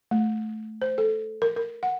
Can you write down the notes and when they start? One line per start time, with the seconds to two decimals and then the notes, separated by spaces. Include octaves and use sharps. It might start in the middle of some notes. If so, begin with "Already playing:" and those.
0.11 A3
0.82 C5
0.98 A4
1.42 A#4
1.56 A#4
1.83 F#5